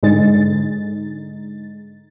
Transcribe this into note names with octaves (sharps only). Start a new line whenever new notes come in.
G#2 D3 G#3 D#4 A6